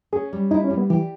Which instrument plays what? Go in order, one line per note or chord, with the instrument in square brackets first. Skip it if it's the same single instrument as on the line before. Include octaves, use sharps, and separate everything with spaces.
[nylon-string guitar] C#4 [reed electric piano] G#4
[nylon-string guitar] G3
[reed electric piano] D#4 [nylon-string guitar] E4
[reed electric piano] C#4
[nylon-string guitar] G3
[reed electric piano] B3
[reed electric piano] E3 [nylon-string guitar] G4